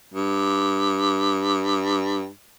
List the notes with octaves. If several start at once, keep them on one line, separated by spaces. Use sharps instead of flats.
G2